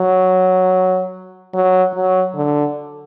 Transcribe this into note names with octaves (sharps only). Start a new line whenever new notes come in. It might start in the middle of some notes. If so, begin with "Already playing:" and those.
Already playing: F#3
F#3
F#3
D3